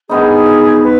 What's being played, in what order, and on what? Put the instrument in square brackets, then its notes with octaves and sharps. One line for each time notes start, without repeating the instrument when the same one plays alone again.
[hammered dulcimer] G2 D#3 B3 D#4 [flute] G#4
[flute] B4